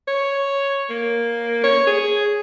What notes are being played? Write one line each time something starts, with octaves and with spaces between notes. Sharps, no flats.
C#5
A#3
C#5
G#4